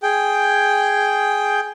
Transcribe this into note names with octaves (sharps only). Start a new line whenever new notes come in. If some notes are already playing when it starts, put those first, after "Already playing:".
G#4 G5